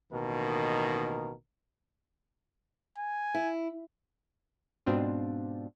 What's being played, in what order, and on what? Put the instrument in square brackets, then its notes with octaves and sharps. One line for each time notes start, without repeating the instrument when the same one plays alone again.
[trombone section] A1 B2 D#3 A#3 A#4
[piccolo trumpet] G#5
[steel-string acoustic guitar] E4
[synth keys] G#2 B2 C4 D4 F4